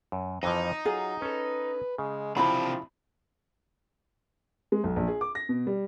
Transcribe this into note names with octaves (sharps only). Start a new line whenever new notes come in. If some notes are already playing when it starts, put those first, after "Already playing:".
F#2
F2 E3 F3 D#4
F#3 F4 G#4
C#4 A4 B4
C#3 G#3
C3 F3 D4 E4 A#5 B5
G#3
B1
A#1
G#4
D6
A#6
B2
G3